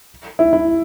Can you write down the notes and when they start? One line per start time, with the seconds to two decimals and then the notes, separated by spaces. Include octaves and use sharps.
0.39 E4
0.53 E4